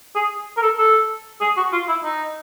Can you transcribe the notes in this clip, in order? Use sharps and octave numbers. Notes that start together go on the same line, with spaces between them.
G#4
A#4
A4
A4
G#4
F#4
F4
E4
D#4